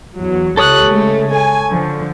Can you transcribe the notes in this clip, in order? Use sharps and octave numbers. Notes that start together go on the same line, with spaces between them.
E2 F#3
C#2 G4 A4 C#5 D#6 F#6
C#3 G#3 A3
G#5
D3 F3